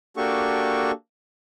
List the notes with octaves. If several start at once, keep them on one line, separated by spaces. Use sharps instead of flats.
A#3 D4 F#4 G4 A4 C#6